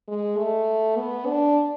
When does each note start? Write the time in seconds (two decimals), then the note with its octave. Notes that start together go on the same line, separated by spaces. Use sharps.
0.08 G#3
0.38 A3
0.97 B3
1.27 D4